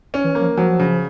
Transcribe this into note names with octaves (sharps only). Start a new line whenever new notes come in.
C#4
E3
A#3
F3
F3 F#3
C#3